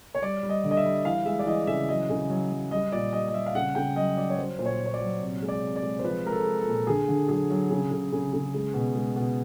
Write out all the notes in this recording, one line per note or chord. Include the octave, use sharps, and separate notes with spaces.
C#5
G3 D5
G3
D#5
D3
D#5
E5
G3
E3 F5
G#3 E5
D5
E3 D#5
C#3 E5
F#3 D#5
C#3
F#3
F#3
G3 D#5
A#2 D5
G3 D#5
D#5
G3 E5
F5
C#3 F#5
C#3 G5
F#3 D#5
F#3 D5
C#5
F#3 C5
A#2 C5
C#5
A#2
C#5
D5
F#3
C3
G#3
D5
C3
D5
G#3
C5
F3 B4
G#3 A#4
A4
G#3
A4
A#2
D3 G#4
D3
F#3 G#4
F#3
C#3
C#3
C#3
C#3
G#3
B2
G#3
B2